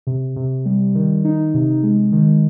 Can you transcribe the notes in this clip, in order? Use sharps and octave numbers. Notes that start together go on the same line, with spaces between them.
C3
C3
G3
D#3
D#4
C3
G#3
D#3